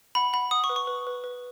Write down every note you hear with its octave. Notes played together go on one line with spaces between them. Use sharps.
F#5 B5
F#5 B5
F#5 D#6
C#6
B4
C#6
B4
B4
B4